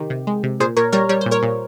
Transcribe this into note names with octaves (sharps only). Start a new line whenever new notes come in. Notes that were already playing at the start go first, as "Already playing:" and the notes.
Already playing: C3 D#3 G4
C3
G#3
C3
A#2 G#4 C5
A#2 A#4 C#5
G3 A#4 C#5
G3 C#5
A#2 C5
A#4 C#5
A#2